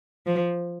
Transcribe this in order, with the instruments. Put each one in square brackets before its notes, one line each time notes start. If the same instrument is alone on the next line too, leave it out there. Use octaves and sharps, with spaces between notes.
[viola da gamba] F3